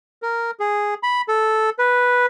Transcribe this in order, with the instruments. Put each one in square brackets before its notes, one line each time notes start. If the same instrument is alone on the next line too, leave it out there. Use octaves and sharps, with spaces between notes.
[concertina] A#4
G#4
B5
A4
B4